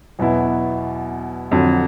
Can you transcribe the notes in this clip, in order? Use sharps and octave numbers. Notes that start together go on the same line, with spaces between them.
E2 B2 F#3 B3 E4
F2 D3 F#3